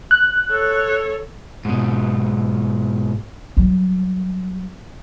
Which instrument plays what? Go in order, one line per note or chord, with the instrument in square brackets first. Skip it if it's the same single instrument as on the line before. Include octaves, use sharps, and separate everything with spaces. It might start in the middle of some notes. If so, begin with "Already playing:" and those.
[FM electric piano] F#6
[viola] A4 C#5
[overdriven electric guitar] G#2 B2
[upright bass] F#3 G3